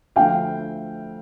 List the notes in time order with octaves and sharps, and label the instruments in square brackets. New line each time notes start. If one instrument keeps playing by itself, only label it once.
[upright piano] D2 D3 F3 A3 F5 G5